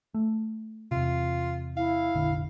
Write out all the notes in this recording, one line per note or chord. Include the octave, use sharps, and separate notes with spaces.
A3
E2 C3 F4
E4 F5
F1 A#1 D3